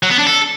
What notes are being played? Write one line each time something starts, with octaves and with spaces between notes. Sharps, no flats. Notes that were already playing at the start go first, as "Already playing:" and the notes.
F#3
B3
D4
A4